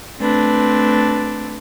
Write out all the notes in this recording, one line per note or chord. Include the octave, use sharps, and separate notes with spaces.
A3 C4 D4 B4